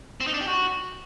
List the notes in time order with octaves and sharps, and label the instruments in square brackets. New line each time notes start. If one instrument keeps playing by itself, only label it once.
[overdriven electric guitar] C4
D#4
D4
G4
F#4